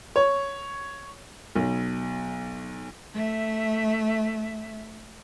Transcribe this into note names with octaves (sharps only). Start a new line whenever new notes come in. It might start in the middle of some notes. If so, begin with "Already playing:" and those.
C#5
B1
A3 E5